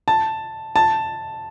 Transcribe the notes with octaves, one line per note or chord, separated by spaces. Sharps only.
A5
A5